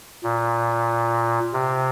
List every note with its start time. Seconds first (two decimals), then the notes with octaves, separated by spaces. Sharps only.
0.23 A#2
1.53 C3